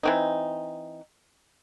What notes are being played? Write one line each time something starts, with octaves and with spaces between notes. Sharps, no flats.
E3 C4 D#4